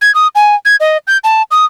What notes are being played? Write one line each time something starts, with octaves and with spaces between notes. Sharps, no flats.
G#6
D#6
G#5
G#6
D#5
G6
A5
D#6